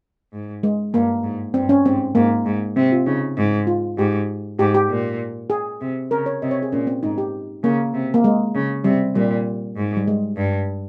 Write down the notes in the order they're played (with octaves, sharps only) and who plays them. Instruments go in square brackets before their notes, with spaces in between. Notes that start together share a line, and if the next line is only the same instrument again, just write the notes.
[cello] G#2
[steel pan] G#3
[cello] G2 [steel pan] A#3
[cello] G#2
[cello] G2 [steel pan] C4
[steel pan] C#4
[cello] G#2 [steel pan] C4
[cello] G#2 [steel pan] A#3
[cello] G#2
[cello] C3 [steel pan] C4
[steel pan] F4
[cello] C#3 [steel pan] D#4
[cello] G#2
[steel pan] F4
[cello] G#2 [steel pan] G4
[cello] G#2 [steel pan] G4
[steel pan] G4
[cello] A#2
[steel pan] G#4
[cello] C3
[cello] C#3 [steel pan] A#4
[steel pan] C#5
[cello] C3 [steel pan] D#5
[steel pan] C#5
G#4
[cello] A#2 [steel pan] C#4
[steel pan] C4
[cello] G#2 [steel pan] D#4
[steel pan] G4
[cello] C#3 [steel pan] A#3
[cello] C3
[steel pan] A#3
G#3
[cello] C#3
[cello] C3 [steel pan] G3
[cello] A#2 [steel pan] G3
[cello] G#2
[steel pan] G3
G#3
[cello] G2